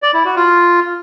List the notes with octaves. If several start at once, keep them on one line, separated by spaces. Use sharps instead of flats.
D5
E4
F#4
F4